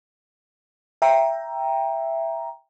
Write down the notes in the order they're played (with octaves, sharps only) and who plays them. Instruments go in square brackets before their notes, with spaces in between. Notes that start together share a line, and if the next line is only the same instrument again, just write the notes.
[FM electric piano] E5 G5 A#5